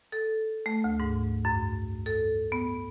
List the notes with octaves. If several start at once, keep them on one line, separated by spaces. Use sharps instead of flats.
A4
A3
D2
G#2
F#2
A4
B3